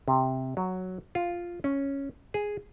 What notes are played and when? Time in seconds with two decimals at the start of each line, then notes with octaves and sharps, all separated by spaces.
0.08 C3
0.57 F#3
1.15 F4
1.64 C#4
2.34 G#4